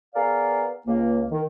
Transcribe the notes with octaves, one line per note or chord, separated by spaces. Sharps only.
B3 G#4 A#4 D5 F5
C#2 A#3
D#3